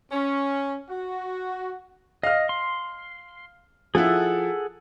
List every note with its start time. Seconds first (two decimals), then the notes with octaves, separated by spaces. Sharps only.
0.12 C#4
0.88 F#4
2.23 D#5 F5 F6
2.49 C6
3.95 F3 E4 G#4 A4 F#5